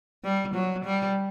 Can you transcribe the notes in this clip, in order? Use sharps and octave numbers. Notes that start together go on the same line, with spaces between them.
G3
F#3
G3